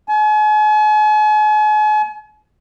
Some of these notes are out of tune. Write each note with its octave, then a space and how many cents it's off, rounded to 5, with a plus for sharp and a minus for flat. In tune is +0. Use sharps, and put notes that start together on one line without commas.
G#5 +40